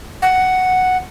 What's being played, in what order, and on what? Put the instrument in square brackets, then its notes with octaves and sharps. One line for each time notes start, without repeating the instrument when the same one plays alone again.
[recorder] F#5